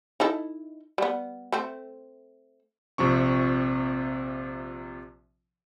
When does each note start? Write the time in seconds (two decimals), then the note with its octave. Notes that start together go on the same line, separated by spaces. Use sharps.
0.20 D#4 E4 A4
0.98 G3 B3
1.52 A3 C4
2.98 A#1 C3 F3 C4 C#6